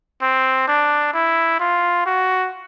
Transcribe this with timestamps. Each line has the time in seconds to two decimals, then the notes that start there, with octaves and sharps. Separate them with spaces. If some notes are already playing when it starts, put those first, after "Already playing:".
0.22 C4
0.68 D4
1.14 E4
1.60 F4
2.06 F#4